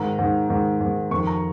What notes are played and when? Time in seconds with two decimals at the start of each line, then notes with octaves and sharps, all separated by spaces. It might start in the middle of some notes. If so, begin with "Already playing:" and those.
Already playing: G#2 D#3 A#5
0.19 G#2 D#3
0.49 G#2 D#3
0.81 G#2 D#3
1.11 F2 D#3 C#6
1.27 A#5